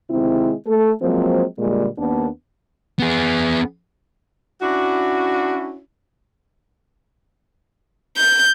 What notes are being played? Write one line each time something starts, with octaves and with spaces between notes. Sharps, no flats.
C3 D#3 G#3 C4 E4
A3 A4
F3 F#3 G#3 A#3 C4
A#2 D3 G3 G#3
D#2 A#3 B3 D4
B3 G#4
C#4 D4 E4 F#4
G6